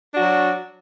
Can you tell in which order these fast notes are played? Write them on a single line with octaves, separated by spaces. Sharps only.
D4 F#4 F#3